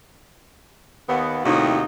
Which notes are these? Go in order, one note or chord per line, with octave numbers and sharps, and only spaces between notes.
D#2 B3
D#2 A2 C3 D#4 F#4